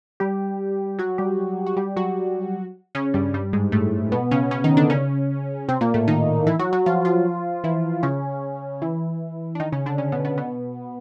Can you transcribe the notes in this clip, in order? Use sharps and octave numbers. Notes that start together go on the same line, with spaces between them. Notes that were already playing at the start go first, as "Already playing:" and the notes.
G3 G4
F#3 F#4
G3 G4
F#4
G3 G4
F#3 F#4
C#3 C#4
G2 G3
G2 G3
G#2 G#3
A2 A3
B2 B3
C#3 C#4
C#3 C#4
D#3 D#4
D3 D4
C#3 C#4
C3 C4
A#2 A#3
A2 A3
D#3 D#4
E3 E4
F#3 F#4
F#3 F#4
F3 F4
F3 F4
E3 E4
C#3 C#4
E3 E4
D4
D#3 D#4
C#3 C#4
D3 D4
C#3 C#4
B2 B3
B2 B3
B2 B3